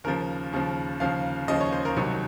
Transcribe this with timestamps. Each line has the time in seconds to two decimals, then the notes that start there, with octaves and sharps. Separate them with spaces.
0.04 D#2 C#3 F3 A#4
0.53 D#2 C#3 F3
1.00 D#2 C#3 F3 F5
1.48 D#2 C#3 F3 D#5
1.61 C#5
1.72 C5
1.85 A#4
1.97 C2 C3 D#3 F#3